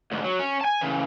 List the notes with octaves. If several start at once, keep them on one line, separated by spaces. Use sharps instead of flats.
D2 G#2
F#3
C#4
G#5 A5
C#3 E3